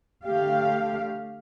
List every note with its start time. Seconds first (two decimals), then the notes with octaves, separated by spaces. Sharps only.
0.25 D3 A3 G4 F5